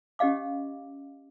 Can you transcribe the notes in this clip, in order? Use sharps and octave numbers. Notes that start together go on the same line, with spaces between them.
C#4 G4 D#5 F5 D6